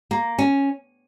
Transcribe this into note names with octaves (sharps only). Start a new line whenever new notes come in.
A#3
C#4